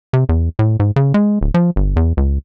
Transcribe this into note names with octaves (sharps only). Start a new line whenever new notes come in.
C3
E2
A2
G#2
C#3
G#3
D1
F3
G1
E2
C#2